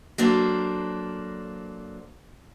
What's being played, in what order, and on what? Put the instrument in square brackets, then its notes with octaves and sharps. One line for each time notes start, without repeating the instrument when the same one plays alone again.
[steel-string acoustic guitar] F#3 A#3 D4 A4 C5